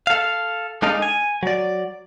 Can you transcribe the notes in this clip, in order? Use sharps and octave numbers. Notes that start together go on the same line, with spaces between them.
A4 F5
G#3 D4 D#4 A4 D#5 F5
G#5
F#3 D5